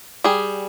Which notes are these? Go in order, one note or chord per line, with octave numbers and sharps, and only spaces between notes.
G3 G#4